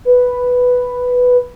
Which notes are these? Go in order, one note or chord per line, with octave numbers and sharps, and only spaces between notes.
B4